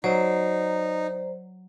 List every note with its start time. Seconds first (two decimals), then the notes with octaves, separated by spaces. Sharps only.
0.04 F#3 D#4 C5 D5 A#5